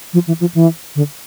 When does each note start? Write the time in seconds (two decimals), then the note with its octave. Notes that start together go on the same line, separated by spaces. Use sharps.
0.13 F3
0.27 E3
0.41 F3
0.54 E3
0.96 D3